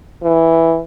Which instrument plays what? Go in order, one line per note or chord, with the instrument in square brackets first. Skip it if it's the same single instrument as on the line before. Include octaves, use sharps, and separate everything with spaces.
[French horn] E3